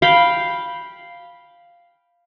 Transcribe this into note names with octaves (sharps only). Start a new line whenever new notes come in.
F5 G5 B5